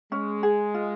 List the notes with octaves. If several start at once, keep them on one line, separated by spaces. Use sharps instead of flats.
G#3 C#4
G#4
F4